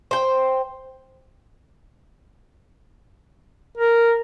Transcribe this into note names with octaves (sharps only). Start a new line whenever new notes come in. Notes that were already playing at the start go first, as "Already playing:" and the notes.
C5 G5
A#4